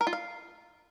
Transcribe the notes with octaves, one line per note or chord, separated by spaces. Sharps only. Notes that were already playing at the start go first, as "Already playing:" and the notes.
A#4
F4
F5